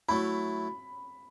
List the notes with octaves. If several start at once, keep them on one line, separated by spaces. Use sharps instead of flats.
F#3 A3 E4 B5